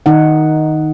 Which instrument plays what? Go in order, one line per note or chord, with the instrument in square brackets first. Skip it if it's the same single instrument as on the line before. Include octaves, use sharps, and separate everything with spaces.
[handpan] D#3 D#4 F#5